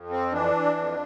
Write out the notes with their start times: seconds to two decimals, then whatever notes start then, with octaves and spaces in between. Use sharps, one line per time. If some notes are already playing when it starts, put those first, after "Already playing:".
Already playing: F2
0.10 C4
0.32 E3 D4
0.77 F2